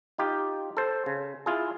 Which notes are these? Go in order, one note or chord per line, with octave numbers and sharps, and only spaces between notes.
D#4 F4 G4
A4 C5
C#3
E4 F4 G#4